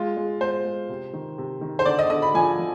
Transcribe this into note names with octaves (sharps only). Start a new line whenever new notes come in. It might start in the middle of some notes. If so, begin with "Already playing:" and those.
Already playing: G#3 F4
G#3
G#3 C5
G#3
C3
D#3
C3
D#3
C5
D3 D5
D#5
D3 D#5
B5
F3 G#5
F3